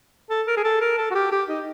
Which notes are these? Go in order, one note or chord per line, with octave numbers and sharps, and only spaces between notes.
A4
A#4
G#4
A4
A#4
A4
F#4
G4
G4
D#4